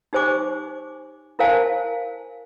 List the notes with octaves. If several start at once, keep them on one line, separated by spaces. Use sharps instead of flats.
D#4 G4 C5 G#5 D6
E4 A#4 C5 F5 G#5 A5